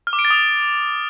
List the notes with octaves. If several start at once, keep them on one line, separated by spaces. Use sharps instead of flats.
F6
D6
D7
A6
D#6